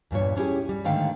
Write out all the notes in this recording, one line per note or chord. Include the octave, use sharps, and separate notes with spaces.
E2 G2 A#2 C#5
B3 C#4 E4 G4 G#4
G3
G#2 D3 D#3 A3 F5 G5